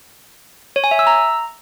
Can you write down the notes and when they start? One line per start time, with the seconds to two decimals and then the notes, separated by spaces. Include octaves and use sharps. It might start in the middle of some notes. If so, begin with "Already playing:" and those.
0.76 C#5
0.84 G#5
0.91 E5
0.99 E6
1.07 A#5